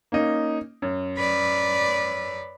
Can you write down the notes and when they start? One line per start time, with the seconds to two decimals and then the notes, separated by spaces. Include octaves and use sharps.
0.12 A#3 C#4 D#4
0.82 F#2
1.17 B4 D5